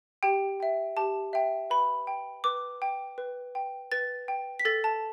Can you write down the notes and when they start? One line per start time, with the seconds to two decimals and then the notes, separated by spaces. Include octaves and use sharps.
0.23 G4 G5
0.60 E5 G5
0.97 G4 A5
1.33 E5 G5
1.70 B4 B5
2.07 G5
2.44 B4 D6
2.82 G5
3.18 B4
3.55 G5
3.92 B4 A6
4.28 G5
4.60 B6
4.65 A4 A6
4.84 A5